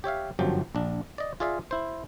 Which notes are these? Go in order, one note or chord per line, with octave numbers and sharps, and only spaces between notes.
G4 C#5 E5 F5
G1 F#2 F3 F#3 G4 A5
A#1 D4
D5 D#5
F4 G#4 D5 E5 F5
E4 C5